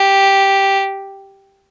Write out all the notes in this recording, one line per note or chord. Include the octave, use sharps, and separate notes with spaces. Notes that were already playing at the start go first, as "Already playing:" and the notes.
Already playing: G4